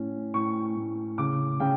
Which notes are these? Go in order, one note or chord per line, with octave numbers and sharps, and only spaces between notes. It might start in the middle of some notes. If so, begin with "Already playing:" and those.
Already playing: A2 C#4
A2 C#6
A2
C#3 D6
C#3 G5